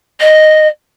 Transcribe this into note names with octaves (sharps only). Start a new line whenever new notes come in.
D#5